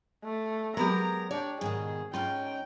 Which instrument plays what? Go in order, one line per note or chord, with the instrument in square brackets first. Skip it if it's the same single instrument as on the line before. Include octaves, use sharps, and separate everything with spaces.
[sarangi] A3
[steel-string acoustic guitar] F#3 A#4 [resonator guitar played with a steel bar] G#3 B3 G4 [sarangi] A#5
[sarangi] D4 [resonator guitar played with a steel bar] C#5 G5 [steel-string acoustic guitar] D5
[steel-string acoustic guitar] G#2 B2 D#3 [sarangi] G#4
[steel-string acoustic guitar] G#2 C#4 D#4 [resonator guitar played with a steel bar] F4 [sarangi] G5